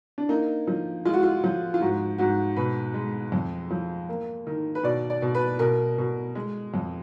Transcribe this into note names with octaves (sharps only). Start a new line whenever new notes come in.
D4
A#3 D#4
F3
G#3 F4
F#4
F4
F3
F4
G#2 F#4
G#2 F#4
B2 B4
G#3
F2
F3
A#3
D#3
B4
B2 D5
D5
B2
B4
B2 A#4
B2
G#3
F2